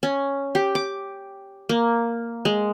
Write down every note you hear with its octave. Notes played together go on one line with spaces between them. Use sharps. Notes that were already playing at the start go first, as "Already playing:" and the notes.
C#4
G4
D6
A#3
G#3